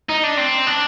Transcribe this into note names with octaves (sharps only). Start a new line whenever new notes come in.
D#4
D4
C4
D4